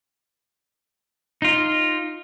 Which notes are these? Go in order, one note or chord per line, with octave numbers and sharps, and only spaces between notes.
D#4 F4